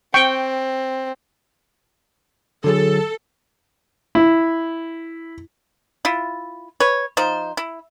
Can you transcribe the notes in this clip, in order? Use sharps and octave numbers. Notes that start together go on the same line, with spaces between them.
C4 G5 C#6
D3 F#3 G#4 A4
E4
E4 F4
B4 C#5
F3 D#4 C5
E4